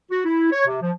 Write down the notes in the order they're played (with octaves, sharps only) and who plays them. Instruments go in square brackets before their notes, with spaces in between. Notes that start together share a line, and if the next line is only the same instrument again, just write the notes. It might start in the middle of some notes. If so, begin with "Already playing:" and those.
[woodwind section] F#4
E4
C#5
C3
F3